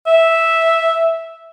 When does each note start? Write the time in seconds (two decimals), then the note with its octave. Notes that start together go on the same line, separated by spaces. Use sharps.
0.07 E5